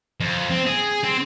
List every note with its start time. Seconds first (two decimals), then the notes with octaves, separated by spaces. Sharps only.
0.20 F2
0.50 C4
0.66 G#4
1.04 C4